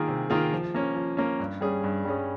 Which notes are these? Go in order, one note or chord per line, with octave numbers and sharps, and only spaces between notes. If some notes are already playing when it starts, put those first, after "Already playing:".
Already playing: D#3 A#3 F4 G#4
C3
D#3 A#3 F4 G#4
F3
A#3 C#4
F3
A#3 C#4
G2
G3 C#4 G#4
G2
G3 C#4 G#4